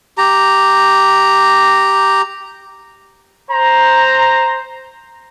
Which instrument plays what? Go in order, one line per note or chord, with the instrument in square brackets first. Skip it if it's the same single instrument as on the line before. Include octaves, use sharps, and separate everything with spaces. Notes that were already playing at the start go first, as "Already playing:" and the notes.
[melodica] G4 A#5
[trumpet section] C5 A#5